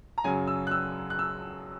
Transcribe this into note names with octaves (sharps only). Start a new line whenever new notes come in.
A#5
F#2 C#3 F#3 G#5
E6
F#6
E6
F#6
E6